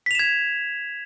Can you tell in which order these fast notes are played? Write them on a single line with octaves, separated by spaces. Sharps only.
B6 F7 E7 G#6